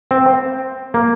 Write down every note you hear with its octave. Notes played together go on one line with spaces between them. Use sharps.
C4
A#3